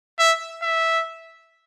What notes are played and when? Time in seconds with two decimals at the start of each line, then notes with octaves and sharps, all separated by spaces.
0.19 E5
0.62 E5